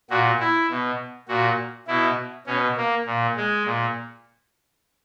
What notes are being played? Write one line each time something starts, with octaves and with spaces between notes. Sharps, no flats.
A#2 F#4
E4
B2
A#2 F#4
B2 E4
B2 C#4
A#3
A#2
G#3
A#2